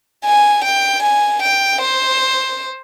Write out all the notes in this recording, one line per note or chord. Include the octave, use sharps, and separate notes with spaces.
G#5
G5
G#5
G5
C5